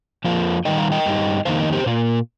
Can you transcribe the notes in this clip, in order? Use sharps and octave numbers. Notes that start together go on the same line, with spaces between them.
F2 F3 A#3 F4
D#3 G3 D#4 D#5 G5
F5 A#5
D#5 G5
G2 G3 D#4
F2 D#3 A#3 D#4 C5 F5
A#4 D#5
G4 C5
A#2 A#3 F4